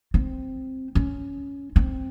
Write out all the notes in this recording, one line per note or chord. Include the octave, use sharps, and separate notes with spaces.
C4
C#4
C4